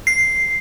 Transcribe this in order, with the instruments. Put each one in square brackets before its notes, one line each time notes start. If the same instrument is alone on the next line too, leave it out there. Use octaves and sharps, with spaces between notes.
[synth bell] C7